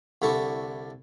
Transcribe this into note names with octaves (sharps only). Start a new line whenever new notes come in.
C2 D3 E4 A4 C#6